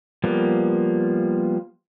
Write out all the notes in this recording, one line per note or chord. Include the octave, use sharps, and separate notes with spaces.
F3 G3 A#3 B3